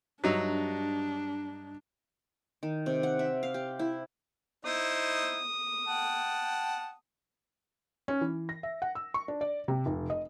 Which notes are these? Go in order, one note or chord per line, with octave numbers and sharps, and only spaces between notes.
G2 F#3 D4 D#4 E5
D#3
C3
F#5
E5
F5
G4
E4
D#4 E4 C5 D#6
F#5 G5 A5
C#4
E3
A#6
E5
F#5
E6
C#6
D4
D5
C3
F1
D#5